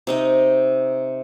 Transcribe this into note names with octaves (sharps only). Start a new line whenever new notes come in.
C3 D#4 D#5